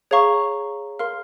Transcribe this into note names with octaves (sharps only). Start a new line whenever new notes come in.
G#4 C#5 F5 A#5 C#6
A#4 F5 C6 F6